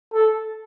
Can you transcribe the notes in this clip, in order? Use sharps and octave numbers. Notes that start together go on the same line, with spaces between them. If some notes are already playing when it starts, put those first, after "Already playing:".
A4